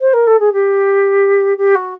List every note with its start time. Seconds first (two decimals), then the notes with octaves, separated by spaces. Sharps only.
0.01 C5
0.14 A#4
0.27 A4
0.40 G#4
0.53 G4
1.58 G4
1.75 F#4